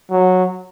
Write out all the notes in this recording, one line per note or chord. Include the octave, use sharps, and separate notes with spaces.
F#3